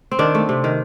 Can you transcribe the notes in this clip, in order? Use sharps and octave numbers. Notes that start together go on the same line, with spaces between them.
C4
D#3 D4
A3
C3
D#3